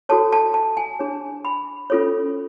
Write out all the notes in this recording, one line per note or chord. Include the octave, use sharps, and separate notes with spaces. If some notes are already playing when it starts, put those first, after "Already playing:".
F#4 A4 C#5 A5
A5
A5
G#5
D4 G#4 C#5
B5
C#4 F4 A4 C#5